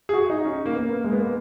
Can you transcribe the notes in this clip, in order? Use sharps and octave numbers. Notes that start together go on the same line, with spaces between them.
G#4
F#4
D#4
C#4
A#3
B3
A#3
G#3
B3
A#3